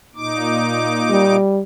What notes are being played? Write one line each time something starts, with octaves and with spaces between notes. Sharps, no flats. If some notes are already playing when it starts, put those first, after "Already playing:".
A#2 D#4 D6
G3